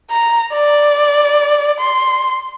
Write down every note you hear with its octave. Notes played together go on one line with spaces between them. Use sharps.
A#5
D5
C6